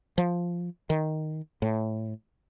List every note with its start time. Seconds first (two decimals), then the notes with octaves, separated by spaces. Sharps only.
0.18 F3
0.90 D#3
1.62 A2